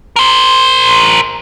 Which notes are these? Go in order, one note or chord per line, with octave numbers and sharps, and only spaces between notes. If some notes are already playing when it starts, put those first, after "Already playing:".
A#4 C5